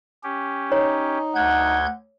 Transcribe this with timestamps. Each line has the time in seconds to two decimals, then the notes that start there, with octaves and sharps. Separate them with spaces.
0.23 C#4 G4
0.72 D#4 C#5
1.35 D2 F#5 G6 G#6